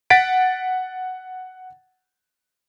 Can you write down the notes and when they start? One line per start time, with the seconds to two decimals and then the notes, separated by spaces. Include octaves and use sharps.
0.10 F#5 A6 B6 D7